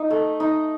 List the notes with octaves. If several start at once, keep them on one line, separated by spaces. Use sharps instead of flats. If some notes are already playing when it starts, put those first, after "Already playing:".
Already playing: D#4 D#5
A3
D#4